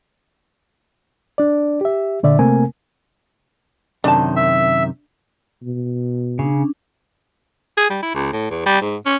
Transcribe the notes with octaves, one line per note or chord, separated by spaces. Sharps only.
D4 D5
G4 E5
A#2 D3 D5 E5
C3 A3 A#3 C4 A#4 G#5
F#2 C3 D#3 D4 A5
E5
B2
C#3 C#4 D4
G#4
G3
E4
C#2
A2
E2
G3
G#2
C#4